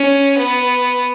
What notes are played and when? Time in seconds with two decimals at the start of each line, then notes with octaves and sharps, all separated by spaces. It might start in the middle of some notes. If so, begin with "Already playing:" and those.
Already playing: C#4
0.37 B3